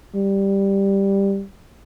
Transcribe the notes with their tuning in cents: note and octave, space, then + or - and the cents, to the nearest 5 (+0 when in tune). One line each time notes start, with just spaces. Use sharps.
G3 +5